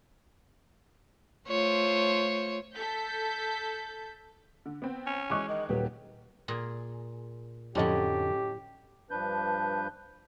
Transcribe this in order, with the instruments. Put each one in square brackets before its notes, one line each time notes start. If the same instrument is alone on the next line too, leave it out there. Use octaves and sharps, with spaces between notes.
[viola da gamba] A3 F4 C5 [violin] C#5
[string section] A4 G6 B6
[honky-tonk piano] D3
B3 C4
[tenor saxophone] C#4
[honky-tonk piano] E3 G#3 G#4 [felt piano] C#6 D6 F#6
[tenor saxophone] D#3 [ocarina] D#5
[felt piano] D#1 [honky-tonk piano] D#3 G4 [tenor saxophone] F#3 [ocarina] B4
[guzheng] A#2 G#4
[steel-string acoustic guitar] F2 D3 [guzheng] A2 F#3 [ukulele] C#4 A4 D#5 [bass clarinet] G4
[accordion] G2 F3 D4 B4 G6